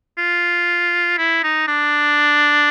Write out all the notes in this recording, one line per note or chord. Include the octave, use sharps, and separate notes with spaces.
F4
E4
D#4
D4